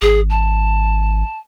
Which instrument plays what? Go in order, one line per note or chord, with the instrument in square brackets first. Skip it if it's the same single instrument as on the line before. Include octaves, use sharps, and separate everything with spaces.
[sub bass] G#1 [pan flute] G#4
[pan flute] A5